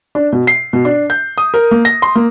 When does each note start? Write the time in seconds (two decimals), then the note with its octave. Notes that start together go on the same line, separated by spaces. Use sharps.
0.15 D4
0.32 B2
0.47 C7
0.73 B2
0.85 D4
1.10 G6
1.38 D#6
1.54 A#4
1.71 A#3
1.85 A#6
2.02 C6
2.15 A#3